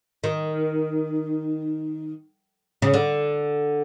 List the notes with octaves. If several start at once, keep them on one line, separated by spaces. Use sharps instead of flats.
D#3
C#3
D3